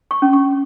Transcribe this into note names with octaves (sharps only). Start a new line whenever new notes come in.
C#6
C#4
C#6